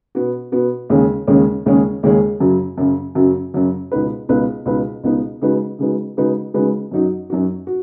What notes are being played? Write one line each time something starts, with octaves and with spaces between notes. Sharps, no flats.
B2 B3 F#4
B2 B3 F#4
D#2 C#3 G#3 C#4 G#4
D#2 C#3 G#3 C#4 G#4
D#2 C#3 G#3 C#4 G#4
D#2 C#3 G#3 C#4 G#4
F#2 C#3 F#3
F#2 C#3 F#3
F#2 C#3 F#3
F#2 C#3 F#3
C#2 B2 B3 D#4 B4
C#2 B2 B3 D#4 B4
C#2 B2 B3 D#4 B4
C#2 B2 B3 D#4 B4
C#3 G#3 D#4 F#4 B4
C#3 G#3 D#4 F#4 B4
C#3 G#3 D#4 F#4 B4
C#3 G#3 D#4 F#4 B4
F#2 F#3 D#4 F#4
F#2 F#3 D#4 F#4
F#4